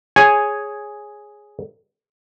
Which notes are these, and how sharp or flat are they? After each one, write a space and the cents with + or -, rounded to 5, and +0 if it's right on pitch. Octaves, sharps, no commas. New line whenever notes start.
G#4 +0 C#5 -5 G#5 +0